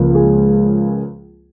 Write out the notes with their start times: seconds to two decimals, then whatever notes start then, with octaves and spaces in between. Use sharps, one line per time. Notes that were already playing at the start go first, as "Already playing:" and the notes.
Already playing: C#2 C#3 F3 A#3
0.15 G#4